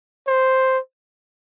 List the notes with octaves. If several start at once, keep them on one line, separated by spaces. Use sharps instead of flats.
C5